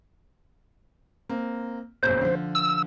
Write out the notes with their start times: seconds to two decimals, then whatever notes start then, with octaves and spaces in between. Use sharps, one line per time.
1.29 A#3 C4
2.03 F#1 B1 F2 C5
2.21 D3 F3
2.55 E6